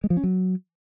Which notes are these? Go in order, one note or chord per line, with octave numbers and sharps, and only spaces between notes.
G#3
F3
C#4
F#3